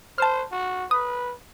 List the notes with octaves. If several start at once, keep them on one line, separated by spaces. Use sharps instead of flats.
C5 A5 F6
F#4
B4 D#6